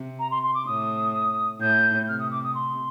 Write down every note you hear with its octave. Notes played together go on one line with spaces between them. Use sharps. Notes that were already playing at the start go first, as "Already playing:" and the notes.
Already playing: C3
A#5
C6
C6
D6
A2 D#6
A2 G6
G6
C3 F6
D#6
D6
D#6
C6